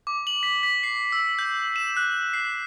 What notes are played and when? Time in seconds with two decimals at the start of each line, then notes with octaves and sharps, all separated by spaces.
0.07 D6
0.27 F#7
0.43 B6
0.63 B6
0.83 C7
1.12 E6
1.39 G6
1.76 E7
1.97 F#6
2.33 C7